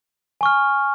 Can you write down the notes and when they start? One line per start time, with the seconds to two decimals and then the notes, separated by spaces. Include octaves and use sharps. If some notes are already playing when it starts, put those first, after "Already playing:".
0.41 G#5 C#6 F6